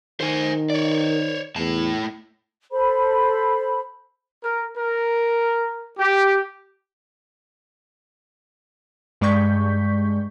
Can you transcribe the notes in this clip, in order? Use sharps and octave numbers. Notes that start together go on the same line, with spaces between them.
D#3 C5 G#5
C#5 D5
E2 A2 A5
A4 C5 B5
A#4
A#4
G4
G2 G#3 D5 C#6 G6 B6